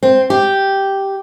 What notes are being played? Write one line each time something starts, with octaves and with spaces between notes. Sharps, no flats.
C4
G4